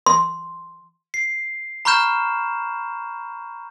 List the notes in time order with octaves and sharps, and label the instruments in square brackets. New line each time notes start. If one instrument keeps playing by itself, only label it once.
[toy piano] C6
[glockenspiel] C7
A#5 B5 C#6 F6 G6 E7